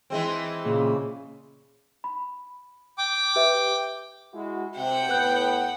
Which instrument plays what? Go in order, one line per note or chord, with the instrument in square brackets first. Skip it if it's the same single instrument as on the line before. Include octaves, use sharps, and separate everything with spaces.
[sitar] E3 G#3 C4
[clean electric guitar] A#2 [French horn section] C#3 G#4
[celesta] B5
[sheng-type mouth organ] G5 D6
[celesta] G4 B4 E5
[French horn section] G#3 E4 F#4
[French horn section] C3 [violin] F#5 G5
[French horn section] A2 B3 [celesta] B4 F#6 G6